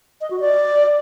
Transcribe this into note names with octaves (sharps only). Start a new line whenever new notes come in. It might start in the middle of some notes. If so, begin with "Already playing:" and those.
D#5
F#4
D5